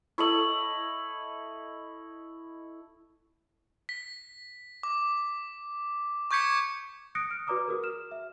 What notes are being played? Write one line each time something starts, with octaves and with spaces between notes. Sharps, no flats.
E4 A4 D#5 C#6 F#7
B6
D6
C#6 D6 G6 G#6 B6 C#7
D#6 F#6 A#6 C#7 D7
F6
F#4 B4 D5 A#5 D6 D#6
F#4 G#4 A#4
F6 E7
E5